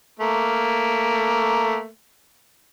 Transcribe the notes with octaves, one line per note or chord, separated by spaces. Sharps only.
A3 A#3